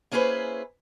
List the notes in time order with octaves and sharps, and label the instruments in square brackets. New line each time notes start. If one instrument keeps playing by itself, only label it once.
[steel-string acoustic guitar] A#3 C#4 E4 G#4 B4 C5